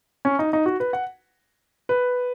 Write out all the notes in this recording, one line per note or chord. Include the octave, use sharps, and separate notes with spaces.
C#4
D#4
D#4
F#4
B4
F#5
B4